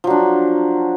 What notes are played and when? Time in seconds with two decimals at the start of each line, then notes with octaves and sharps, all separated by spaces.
0.04 F3
0.07 F#3
0.10 D4